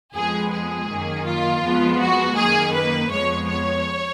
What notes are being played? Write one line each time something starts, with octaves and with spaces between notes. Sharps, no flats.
F2 F3 G#3 B3 G#4
G#4
F#2 D#3 A#3
F4
F2 F3 G#3 B3
F#4
F#2 D#3 A#3 G#4
B4
F2 F3 G#3 B3 C#5
C#5